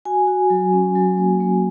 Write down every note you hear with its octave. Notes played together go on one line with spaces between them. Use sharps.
F#4 G#5
F#4
F#3
C#4
F#3
A#3
A#3